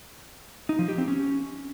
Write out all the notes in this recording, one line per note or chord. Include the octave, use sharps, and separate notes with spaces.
D#4
F3
G4
C4
C#4